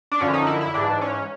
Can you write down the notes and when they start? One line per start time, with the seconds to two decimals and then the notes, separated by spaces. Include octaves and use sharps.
0.12 D4
0.20 F#2 D3 F3 C#4
0.34 D#4
0.47 E4
0.61 E4
0.74 G#2 E3 D4
1.01 C#4